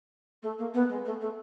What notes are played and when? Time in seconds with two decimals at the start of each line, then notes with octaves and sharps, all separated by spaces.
0.42 A3
0.58 A#3
0.74 B3
0.89 G#3
1.05 A3
1.21 A3